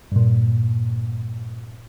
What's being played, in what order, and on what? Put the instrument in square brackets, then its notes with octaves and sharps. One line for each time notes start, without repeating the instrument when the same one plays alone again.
[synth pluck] G2 A#2